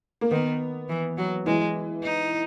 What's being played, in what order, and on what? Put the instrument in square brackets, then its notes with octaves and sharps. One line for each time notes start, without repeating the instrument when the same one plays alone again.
[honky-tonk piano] A#3
[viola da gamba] D#3 [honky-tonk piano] B3
[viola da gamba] E3
F#3
[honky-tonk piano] E3 [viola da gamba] G#3
[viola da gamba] D#4